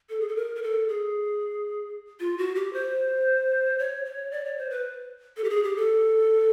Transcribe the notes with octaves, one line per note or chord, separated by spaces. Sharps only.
A4
G#4
A4
A#4
A#4
A4
G#4
F4
F#4
G4
C5
C#5
C#5
D5
C#5
C5
B4
A4
G4
G#4
G4
A4